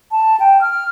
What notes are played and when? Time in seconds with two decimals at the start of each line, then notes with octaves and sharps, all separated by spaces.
0.12 A5
0.40 G5
0.61 F6